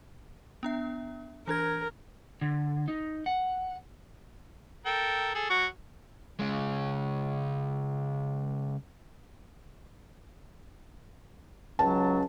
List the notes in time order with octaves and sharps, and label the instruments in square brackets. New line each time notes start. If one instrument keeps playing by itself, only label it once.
[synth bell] B3 D4 E5
[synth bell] E3 D4 G#6 [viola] A#4
[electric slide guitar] D3
D#4
F#5
[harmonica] A4 A#4 G5
G#4 A4
F#3 F#5 C#6
[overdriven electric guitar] C#3 G#3
[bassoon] C#2 [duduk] F#3 [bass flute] C#4 [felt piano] A5